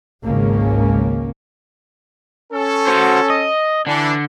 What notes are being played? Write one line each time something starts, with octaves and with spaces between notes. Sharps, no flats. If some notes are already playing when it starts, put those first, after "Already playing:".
G#1 C#2 C#3 A#3 C#4
C#4 A4
F#4 C5
D#5
D3 E3 D4